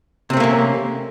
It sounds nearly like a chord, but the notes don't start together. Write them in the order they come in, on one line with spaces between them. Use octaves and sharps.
C3 C4 A3 A#3 C#4